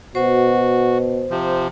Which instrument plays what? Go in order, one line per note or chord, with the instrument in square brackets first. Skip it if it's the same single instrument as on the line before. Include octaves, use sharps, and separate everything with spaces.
[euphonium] B2 [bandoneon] F#4 [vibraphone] C5
[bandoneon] C3 F3